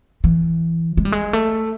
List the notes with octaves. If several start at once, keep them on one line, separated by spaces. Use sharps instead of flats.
E3
G#3
G3
G#3
A3